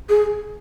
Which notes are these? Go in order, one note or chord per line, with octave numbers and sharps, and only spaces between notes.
G#4